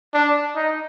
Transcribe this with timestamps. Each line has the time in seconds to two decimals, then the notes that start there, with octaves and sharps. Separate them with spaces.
0.14 D4
0.55 D#4